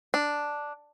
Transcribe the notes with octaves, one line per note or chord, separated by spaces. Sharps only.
D4